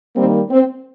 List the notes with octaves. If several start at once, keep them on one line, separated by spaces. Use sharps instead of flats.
D#3 G3 A#3 C4
C4